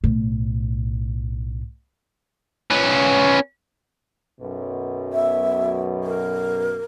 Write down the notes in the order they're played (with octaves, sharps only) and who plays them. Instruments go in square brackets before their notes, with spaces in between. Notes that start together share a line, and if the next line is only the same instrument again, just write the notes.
[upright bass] B1 A2
[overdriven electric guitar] C#4 B4
[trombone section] B1 F#2 B2
[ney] E5
A#4